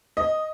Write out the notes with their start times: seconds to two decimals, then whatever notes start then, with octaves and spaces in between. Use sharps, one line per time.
0.17 D#5